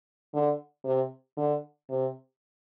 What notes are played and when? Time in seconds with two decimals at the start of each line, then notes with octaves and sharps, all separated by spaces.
0.34 D3
0.85 C3
1.37 D3
1.90 C3